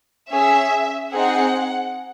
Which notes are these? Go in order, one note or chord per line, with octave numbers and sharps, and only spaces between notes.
C#4 G#4 E5
C4 D#4 G#4 F#5